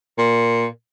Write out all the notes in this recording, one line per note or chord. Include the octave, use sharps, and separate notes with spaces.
A#2